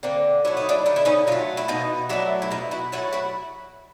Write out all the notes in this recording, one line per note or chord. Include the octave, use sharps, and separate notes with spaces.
D3 A#3 C4
F#3 A3 E4
D#4
D4 E4
D3 D#4
E4
C#4 D#4
F#3 A3 D#4 F4
E4
B2 D#4 F4
F#3 A3 D4 E4
E4
B2 D#4 F4
E4 F#4
F#3 A3 E4 F#4
E4 F#4